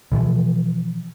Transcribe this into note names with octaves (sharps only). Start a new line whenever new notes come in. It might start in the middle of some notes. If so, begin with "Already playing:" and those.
B2 E3 F3